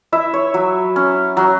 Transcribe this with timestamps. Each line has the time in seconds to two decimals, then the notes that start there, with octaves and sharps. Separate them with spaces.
0.12 E4 E5
0.34 C#5
0.54 F#3
0.96 C#4
1.37 F#3